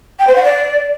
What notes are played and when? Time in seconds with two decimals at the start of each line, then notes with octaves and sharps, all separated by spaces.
0.19 G5
0.27 C5
0.35 F#5
0.44 D5